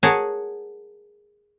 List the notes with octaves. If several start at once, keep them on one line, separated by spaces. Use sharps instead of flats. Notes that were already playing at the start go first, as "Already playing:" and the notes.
G#4 A#4 C#5 F#5 G#5 A5